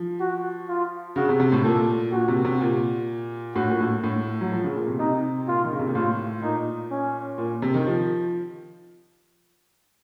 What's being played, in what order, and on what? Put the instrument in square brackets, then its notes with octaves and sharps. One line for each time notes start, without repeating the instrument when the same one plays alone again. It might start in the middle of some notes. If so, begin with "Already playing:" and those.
Already playing: [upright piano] F3
[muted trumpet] F#4
F4
[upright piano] C#3 [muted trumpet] F#4
[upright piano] C3
C3
A2
[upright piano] A#2 [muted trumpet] A4
[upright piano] A#2 [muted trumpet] F#4
[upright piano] C3
C3
A#2
[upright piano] A2 [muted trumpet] F#4
[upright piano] A#2
A2
A2
F#3
F3
C#3
A#2
C3
[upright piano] C3 [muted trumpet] D#4
[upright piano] A#2 [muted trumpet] F4
[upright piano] D#3
C#3
C3
A#2
[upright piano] A2 [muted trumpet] F4
[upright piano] A#2 [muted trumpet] D#4
[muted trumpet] C#4
[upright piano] A#2
C3
D#3
F3